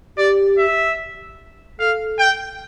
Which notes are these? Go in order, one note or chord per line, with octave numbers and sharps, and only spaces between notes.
G4 D5
E5
A4 F5
G5